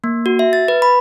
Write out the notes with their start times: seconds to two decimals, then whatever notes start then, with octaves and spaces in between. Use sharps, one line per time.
0.04 A#3
0.26 F#4
0.39 E5
0.53 A6
0.68 B4
0.82 B5